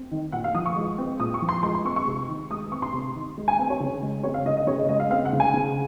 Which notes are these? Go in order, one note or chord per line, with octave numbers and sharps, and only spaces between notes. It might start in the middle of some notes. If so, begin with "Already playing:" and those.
Already playing: C4
D#3
A#2 F#5
F5
F3 D#6
C#6
G#3
C4
A#2 D#6
C#6
F3
C6
G#3 C6
C6
C4 C#6
C#6
C3
D#3
G#3 D#6
C4 C#6
C6
C3
D#3
G#3
G#5
C4 G#5
C#5
C#3
G#3
C4 C#5
F5
C#3 D#5
D#5
C#3 C#5
D#5
G#3 D#5
F5
C4 F5
F#5
C#3
G#5
C#3